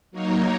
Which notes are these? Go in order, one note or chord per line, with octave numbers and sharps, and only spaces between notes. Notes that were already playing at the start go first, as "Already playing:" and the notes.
F#3 A#3 D#4 A#4 C#5